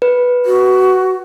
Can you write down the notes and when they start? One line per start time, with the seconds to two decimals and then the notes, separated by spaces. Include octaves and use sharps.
0.02 B4
0.46 F#4